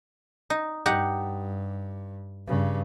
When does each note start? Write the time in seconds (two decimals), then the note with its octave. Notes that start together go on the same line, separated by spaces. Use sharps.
0.50 D#4
0.86 G2 D#4 G4 F#5
2.47 G2 C#3